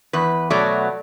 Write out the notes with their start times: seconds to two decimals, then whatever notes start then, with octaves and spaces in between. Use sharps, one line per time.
0.13 E2 B4
0.50 B2 F#3 A3 D5